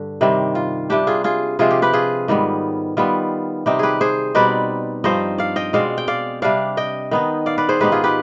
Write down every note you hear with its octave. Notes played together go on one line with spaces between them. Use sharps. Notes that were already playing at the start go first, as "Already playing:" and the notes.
Already playing: G2 D3
C3 D#3 G3 C4
F4
C3 G3 D4 G4
F4 G#4
F4 G#4
C3 F3 G#3 C4 F4 G#4
G4
G4 B4
F4 G#4
G#2 D#3 G3 B3
D#3 G3 B3 F4
C3 G3 C4 D#4 G4
G4 G#4 B4
G#4 C5
B2 G3 C4 D#4 B4 D5
G2 F3 C4 D#4 C5 D#5
D5 F5
D#5 G5
B2 G#3 C4 D5 F5
G5
D5 F5
C3 G3 D4 D5 F5
D#5 G5
D#3 B3 D#4
D5 F5
B4 D5
G#4 C5
G#2 D#3 B3 D#4 G4 B4
F4 G#4
G4 B4